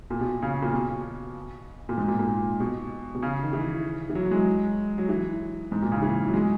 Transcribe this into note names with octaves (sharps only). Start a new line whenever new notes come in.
A#2
B2
C#3
A#2
B2
A#2
G#2
A#2
A#2
B2
B2
C#3
D#3
E3
E3
F#3
F#3
G#3
F#3
E3
G#2
A#2
C#3
E3
F#3
G#3